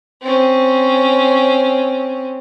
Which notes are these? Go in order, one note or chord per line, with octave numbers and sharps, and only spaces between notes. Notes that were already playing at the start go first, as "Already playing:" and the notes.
C4 C#4